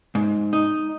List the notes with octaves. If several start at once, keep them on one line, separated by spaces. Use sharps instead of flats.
G#2
D#4